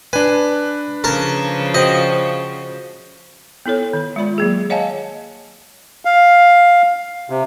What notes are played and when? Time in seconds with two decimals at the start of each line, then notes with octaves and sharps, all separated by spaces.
0.13 D4 B4 G#5
1.04 C#3 F3 A#4 A5 A#5
1.74 F#4 C5 D#5 G5
3.66 B3 E4 A4 C#5
3.93 D#3
4.16 G#3 F4 D5 B5
4.38 F#3 A#3 G#4
4.70 C#5 D#5 F5 F#5 G#5 A5
6.05 F5
7.30 C3